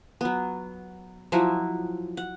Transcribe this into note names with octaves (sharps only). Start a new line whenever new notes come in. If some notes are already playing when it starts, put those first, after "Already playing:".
F#3 B3
F3 F#3 E4 F#4
F#5